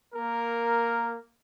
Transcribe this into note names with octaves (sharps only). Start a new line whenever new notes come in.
A#3 A#4